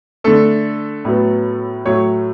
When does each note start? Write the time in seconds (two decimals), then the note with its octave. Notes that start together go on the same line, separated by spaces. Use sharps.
0.24 D3 A3 A4
1.05 A2 F#3 B3
1.85 A2 F#3 A3 C#5